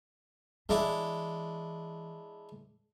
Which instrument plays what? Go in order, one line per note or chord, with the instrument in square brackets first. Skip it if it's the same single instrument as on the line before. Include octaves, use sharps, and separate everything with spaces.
[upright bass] E3 [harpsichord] G#3 D4 E4